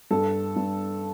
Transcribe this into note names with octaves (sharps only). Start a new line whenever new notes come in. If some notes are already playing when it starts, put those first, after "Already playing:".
G2 A4
G2